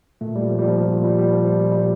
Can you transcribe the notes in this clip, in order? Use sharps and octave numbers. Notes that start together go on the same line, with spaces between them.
A#2 A3
G3
A#2
F3
A#2 G3
F3
A#2
A#2 G3
G3
A#2
F3
A#2 G3
G3
A#2
G3